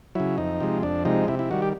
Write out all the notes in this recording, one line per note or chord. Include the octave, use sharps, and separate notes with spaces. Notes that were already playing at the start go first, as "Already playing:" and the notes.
C#3 F#3 E4
F2 D#4
C3 F3 G#3
F2 D4
C3 F3 G#3 D#4
C3 E4
E4
D#3 G3 F#4
G4